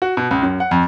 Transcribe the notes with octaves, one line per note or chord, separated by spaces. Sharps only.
F#4
B2
C#2
F#2
F#5
F2